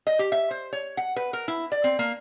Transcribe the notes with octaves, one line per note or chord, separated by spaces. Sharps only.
D#5
G4
E5
C5
C#5
F#5
B4
A#4
E4
D5
C4
A#3